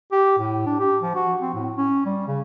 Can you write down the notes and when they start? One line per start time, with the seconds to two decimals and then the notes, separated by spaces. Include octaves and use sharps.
0.12 G4
0.38 A2
0.66 D4
0.80 G4
1.02 F3
1.15 F#4
1.41 C4
1.55 A2
1.77 C#4
2.06 G3
2.28 C#3